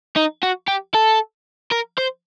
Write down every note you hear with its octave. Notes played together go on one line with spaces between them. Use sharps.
D#4
F#4
G4
A4
A#4
C5